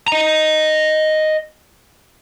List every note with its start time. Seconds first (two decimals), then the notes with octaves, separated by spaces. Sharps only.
0.08 D#5 A#5